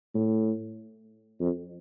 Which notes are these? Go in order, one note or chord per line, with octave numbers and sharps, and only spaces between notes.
A2
F2